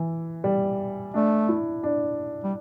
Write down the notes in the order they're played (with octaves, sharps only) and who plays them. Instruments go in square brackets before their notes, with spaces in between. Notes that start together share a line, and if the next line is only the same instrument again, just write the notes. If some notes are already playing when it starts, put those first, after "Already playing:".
Already playing: [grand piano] E3
G3
[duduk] A3 [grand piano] D4
[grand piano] E4
D4
[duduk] G3